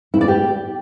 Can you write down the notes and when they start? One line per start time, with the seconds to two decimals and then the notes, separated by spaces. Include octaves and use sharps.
0.14 E4
0.21 D5
0.28 G4